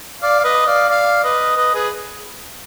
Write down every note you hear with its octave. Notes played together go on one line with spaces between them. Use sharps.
D5 F5
F5
B4 D#5
D5 F5
D5 F5
B4 D#5
B4 D#5
G#4 B4